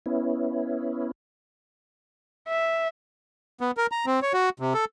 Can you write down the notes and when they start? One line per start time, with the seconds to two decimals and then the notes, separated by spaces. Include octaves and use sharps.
0.06 B3 C#4 E4
2.48 E5
3.61 B3
3.77 A#4
3.92 A#5
4.06 C4
4.22 C#5
4.33 F#4
4.60 C3
4.74 A4